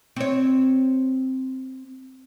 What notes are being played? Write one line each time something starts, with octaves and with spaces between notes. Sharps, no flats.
C4 C#5